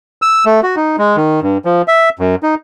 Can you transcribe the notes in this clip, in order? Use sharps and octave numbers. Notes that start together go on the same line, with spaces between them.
E6
A3
F#4
D#4
G#3
D#3
G2
F3
E5
F#2
D#4